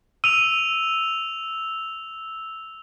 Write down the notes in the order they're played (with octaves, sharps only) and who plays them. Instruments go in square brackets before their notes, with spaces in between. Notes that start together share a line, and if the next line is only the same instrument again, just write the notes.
[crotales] E6 F7 [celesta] D#7